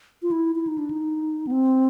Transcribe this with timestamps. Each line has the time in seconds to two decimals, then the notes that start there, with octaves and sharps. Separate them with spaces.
0.22 F4
0.31 E4
0.55 E4
0.67 D#4
0.78 D4
0.91 D#4
1.47 B3
1.51 C4